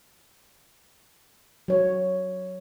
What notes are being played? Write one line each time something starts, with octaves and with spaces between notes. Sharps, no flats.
F#3 C#5